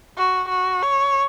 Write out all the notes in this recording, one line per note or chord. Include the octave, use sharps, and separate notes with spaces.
F#4
F#4
C#5